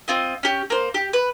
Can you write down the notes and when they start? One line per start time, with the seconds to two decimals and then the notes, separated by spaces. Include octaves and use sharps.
0.08 C4 F4 D#5
0.43 C#4 G4
0.70 A#3 C5
0.94 G4
1.13 B4